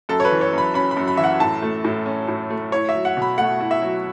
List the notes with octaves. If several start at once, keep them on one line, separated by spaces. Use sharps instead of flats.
F#2 A4
C#5
B4
E3
C#5
F#2 B5
C#4 B5
B5
F#2
B5
E3 E5
F#5
A2 A5
A3
A2
C#4
A2
A3
E4 C#5
E5
F#3
F#5
B2
B5
A3 F#5
E4
E5
F#3